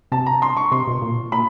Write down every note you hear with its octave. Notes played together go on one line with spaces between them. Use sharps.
C3 A5
A#5
C6
C#6
C3 C6
B2
A#2
A#2 B5